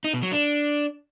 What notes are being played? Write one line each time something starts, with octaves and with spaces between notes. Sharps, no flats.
D#4
B2
F#3
D4